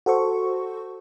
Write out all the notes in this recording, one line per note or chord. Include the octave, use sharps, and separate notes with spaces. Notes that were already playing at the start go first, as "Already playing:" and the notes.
F#4 A4 C5 C#6